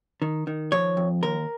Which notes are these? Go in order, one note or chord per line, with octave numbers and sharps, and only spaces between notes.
D#3
D#3
F3 C#5
F2
D#2 A#4